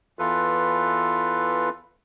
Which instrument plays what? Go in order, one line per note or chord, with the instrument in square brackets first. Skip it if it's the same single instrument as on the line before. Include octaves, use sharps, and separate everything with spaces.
[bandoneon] E2 E3 F4 A4 B4